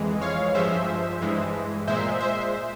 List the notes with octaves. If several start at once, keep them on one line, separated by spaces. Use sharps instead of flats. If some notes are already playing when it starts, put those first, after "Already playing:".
Already playing: F2 E3 G#3
C#5 F5
G2 F3 G#3 C5 E5
G2 E3 G#3
A#2 G#3 C5 E5
C5 E5